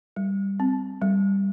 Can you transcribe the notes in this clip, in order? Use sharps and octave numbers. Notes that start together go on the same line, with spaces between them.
G3
C4
G3